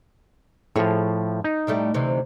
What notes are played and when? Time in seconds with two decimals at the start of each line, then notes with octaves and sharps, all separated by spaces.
0.76 A2 F3 G#4 C#5
1.44 D#4
1.67 A2 G3 A3
1.94 D2 C3 E3